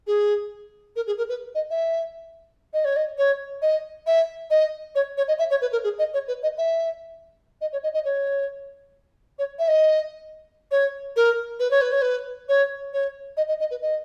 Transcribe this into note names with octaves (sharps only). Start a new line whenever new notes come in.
G#4
A#4
G#4
A#4
B4
D#5
E5
D#5
C#5
D#5
C#5
D#5
E5
D#5
C#5
C#5
D#5
E5
C#5
B4
A#4
G#4
D#5
C#5
B4
D#5
E5
D#5
C#5
D#5
D#5
C#5
C#5
E5
D#5
C#5
A#4
B4
C#5
B4
C#5
B4
C#5
C#5
D#5
D#5
D#5
B4
D#5